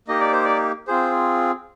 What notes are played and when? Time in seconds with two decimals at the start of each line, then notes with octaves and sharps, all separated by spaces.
0.08 A#3 D#4 G4 D#5
0.20 D5
0.32 C5
0.44 D5
0.88 C4 F4 G#4 C5